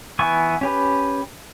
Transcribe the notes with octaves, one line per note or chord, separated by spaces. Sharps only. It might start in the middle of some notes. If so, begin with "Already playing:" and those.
E3 B3 G#5 C#6
C#4 G4 B4